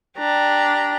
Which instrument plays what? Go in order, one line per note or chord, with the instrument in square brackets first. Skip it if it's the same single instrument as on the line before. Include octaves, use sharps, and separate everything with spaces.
[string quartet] D4 G4 A#5